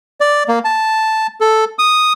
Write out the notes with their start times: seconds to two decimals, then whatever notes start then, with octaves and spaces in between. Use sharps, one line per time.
0.20 D5
0.48 A#3
0.64 A5
1.40 A4
1.79 D#6